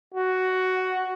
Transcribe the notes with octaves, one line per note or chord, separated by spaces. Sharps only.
F#4